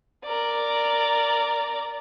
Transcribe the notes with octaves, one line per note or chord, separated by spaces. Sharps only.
A#4 D5